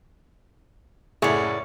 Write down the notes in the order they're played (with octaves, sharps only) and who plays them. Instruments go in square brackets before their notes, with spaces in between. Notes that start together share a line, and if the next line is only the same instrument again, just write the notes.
[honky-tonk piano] F#1 A2 A4 [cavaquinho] E4 D5 [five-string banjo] G#4 F#5 [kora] C#5